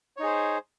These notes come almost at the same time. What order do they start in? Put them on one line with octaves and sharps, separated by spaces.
C#5 D#4 G#4 C5